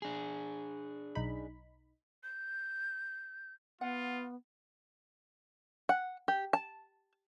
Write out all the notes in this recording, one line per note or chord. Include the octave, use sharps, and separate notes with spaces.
D4 G#4
B1 D#4 B5
G6
B3 F4 F#5
F#5
G4
A5